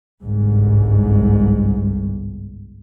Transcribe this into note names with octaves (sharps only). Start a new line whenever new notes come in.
G1 C2 G#2